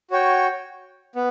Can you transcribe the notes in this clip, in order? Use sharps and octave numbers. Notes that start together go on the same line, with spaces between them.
F#4 C#5 G5
B3